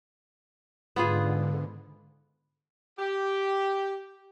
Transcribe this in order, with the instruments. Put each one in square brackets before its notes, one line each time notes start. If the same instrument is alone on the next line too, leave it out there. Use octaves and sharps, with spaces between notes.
[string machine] G#2 D3 [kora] B3 F4 G#4
[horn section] G4